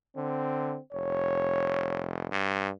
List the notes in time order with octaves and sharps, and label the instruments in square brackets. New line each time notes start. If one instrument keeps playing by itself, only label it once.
[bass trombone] D3 [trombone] C4
[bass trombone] F1 [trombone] C#5
[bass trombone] G2